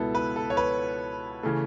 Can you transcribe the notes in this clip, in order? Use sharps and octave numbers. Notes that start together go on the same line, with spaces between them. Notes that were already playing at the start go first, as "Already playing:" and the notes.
Already playing: C#2 B2 B3 E4 A4
B4
A4
C#5
B4
C#3 E3 A3